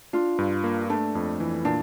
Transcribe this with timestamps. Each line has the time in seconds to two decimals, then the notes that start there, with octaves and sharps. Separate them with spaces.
0.13 D4 F4
0.39 G2
0.64 A#3
0.89 A3 D4
1.15 F2
1.40 E3
1.65 A#2 D4